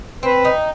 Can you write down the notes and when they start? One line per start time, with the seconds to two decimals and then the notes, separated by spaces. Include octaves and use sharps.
0.23 C4 B4
0.45 D#4